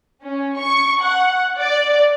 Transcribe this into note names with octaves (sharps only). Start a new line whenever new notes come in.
C#4
C#6
F#5
D5